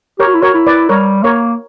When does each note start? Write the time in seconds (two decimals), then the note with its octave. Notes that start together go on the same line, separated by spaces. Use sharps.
0.19 G4 A#4 C#5
0.27 F#4
0.34 E4
0.42 F#4 A#4 C#5
0.54 E4
0.67 B4 D5
0.89 G3 A#4 C#5
1.23 A#3 A#4 C#5